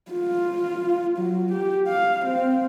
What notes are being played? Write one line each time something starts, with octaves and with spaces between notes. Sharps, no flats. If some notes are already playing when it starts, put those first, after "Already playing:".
F4
F#3
G4
F5
C4